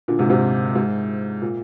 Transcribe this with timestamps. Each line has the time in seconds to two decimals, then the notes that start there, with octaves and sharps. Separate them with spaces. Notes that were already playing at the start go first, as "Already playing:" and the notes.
0.08 A#2 D3
0.19 G#2 C3
0.30 G#2 C3
0.75 G#2
1.42 A#2